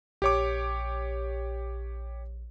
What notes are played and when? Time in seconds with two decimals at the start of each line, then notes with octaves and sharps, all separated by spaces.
0.22 A#1 G4 C#5 D6